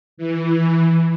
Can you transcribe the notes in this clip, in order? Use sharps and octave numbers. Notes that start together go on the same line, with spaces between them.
E3